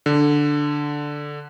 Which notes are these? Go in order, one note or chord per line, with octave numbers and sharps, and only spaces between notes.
D3